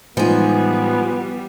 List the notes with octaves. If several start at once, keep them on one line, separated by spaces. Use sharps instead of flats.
A2 E3 F3 G3 G#3 B3 D#4 G#4